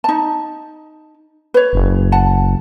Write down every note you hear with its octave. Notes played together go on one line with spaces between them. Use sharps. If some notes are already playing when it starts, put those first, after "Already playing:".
D#4 A5
B4 C#5
F#1
F#5 A5